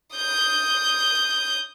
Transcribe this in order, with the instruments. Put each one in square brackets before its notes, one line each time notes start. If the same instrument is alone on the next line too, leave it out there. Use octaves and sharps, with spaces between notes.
[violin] D#6 G6